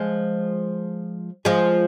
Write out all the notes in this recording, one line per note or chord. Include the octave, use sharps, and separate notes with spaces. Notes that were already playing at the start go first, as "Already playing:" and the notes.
Already playing: F3 G#3
F3 G#3